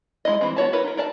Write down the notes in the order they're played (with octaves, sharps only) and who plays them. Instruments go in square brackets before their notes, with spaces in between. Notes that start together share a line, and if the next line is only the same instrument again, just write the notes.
[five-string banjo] G#3 D#4 E4 D#5
E3 C4
B3 F#4 C#5 A5
E4 A#4 B4 C#5
D#4 A#4
A#4 D5 A5